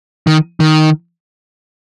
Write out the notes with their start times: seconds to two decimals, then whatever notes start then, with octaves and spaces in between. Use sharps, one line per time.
0.27 D#3
0.60 D#3